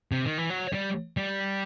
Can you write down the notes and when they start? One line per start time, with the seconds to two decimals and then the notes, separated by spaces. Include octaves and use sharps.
0.12 C3
0.25 D#3
0.38 E3
0.50 F#3
0.73 G3
1.17 G3